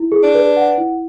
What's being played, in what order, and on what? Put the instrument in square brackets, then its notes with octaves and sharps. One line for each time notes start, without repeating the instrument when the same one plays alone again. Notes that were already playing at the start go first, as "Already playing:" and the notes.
Already playing: [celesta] E4
G#4
[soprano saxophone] D4
[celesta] B4
F#5
E4